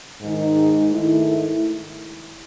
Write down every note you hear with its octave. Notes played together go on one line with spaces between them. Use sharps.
G#2 D#3 G#3 D#4
G#2 D#3 A3 E4